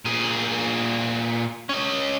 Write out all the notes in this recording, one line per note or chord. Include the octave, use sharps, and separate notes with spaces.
A#2 G#4
C#4 D#5